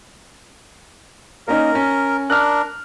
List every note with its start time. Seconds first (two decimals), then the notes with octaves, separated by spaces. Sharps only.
1.48 A#3 C#4 D#4 A#4
1.75 C#4
2.30 D4 A#4 F6 F#6